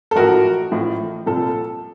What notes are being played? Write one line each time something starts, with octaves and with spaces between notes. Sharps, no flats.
A4
A1 A2 F3 F#4 A#4
A1 A2 F3
C2 A#2 F3 A4